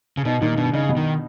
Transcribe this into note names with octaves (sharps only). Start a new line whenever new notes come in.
C#3
B2 D#4
A#2 D#3
G2 B2
C#3 D#4
B2
D#3